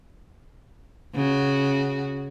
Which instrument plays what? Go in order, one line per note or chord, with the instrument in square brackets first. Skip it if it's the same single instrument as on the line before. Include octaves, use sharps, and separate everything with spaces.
[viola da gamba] C#3 F#4